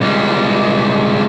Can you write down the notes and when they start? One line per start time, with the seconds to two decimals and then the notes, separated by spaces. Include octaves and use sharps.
0.01 C#2 G3